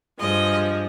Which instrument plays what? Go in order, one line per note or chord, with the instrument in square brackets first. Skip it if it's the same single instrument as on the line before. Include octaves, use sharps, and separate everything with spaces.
[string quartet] G2 F3 G#3 D#5